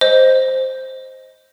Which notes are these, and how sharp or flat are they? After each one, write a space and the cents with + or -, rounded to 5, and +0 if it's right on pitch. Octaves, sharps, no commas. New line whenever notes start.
C5 +0 D#5 +0